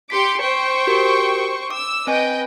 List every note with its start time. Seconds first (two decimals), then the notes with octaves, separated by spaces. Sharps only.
0.10 G4 C6 D6 B6 C#7
0.40 C5 G5 C#6
0.87 F#4 G4 A#4
1.71 D6 E6
2.07 C4 B4 D#5 G5 G#5